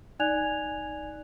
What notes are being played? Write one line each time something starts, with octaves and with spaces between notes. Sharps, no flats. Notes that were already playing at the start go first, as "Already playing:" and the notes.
D#4 D5 G#5 F#6 G#6 F7